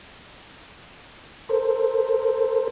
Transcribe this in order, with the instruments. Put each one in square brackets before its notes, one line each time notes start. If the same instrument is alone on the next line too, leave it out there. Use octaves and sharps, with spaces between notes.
[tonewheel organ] A4 A#4 C5